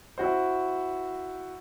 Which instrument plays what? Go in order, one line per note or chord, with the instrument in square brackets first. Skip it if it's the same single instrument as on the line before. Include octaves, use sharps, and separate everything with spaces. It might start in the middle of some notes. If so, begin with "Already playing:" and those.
[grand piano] E4 F#4 C5